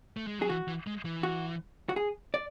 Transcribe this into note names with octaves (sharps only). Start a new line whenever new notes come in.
A3
G#3
F#3 G#4
E3 F#4
E3
G#3
E3
F#4
F#4
G#4
D5